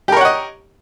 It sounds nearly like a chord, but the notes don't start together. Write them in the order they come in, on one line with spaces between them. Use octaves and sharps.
G4 A#4 C#5 F#5 D#5